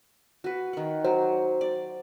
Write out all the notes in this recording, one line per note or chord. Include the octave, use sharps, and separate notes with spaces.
F#4 B4
D#3 F#5
F#3 C5
D5